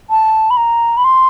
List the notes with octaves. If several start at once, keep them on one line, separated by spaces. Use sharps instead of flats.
A5
B5
A#5
B5
C6